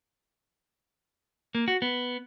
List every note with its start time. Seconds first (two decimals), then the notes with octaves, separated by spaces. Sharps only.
1.55 A#3
1.68 F#4
1.82 B3